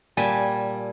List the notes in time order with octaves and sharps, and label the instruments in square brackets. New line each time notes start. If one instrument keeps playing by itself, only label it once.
[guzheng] A#2 G3 G#5 A5